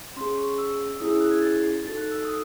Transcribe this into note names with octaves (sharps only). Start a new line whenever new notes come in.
C#4 G#4 C6
C#6
E6
C#4 E4 G#4 D#6
E6
F#6
G#6
A6
C7
D#4 F#4 A4 A6
F#6
E6
D#6